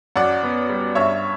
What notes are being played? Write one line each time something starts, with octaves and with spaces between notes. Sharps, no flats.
F#2 D5 F#5
B3
G3
G2 C#5 E5